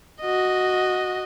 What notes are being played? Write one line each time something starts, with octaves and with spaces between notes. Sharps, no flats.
F#4 D#5